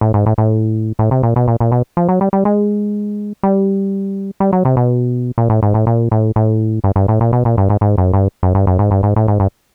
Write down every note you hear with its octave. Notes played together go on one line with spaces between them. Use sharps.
A2
G#2
A2
A2
A2
C3
A#2
B2
A#2
A#2
B2
F3
F#3
G3
G3
G#3
G3
G3
F#3
C3
B2
A#2
A2
G#2
A2
A#2
A2
A2
G2
G2
A2
A#2
B2
A#2
G2
G#2
G#2
F#2
G2
F#2
G2
F#2
G#2
G2
G#2
A2
G#2
G2